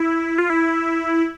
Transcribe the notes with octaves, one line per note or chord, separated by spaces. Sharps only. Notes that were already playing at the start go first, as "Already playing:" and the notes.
Already playing: E4
F4
E4